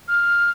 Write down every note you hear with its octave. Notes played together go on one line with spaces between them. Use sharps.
F6